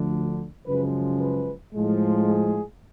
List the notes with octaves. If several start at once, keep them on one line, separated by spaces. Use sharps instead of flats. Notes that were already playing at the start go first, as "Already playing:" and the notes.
Already playing: D2 D3 F3
F#2 C#3 F3 G#3 B4
B4
A2 F3 G#3
G#4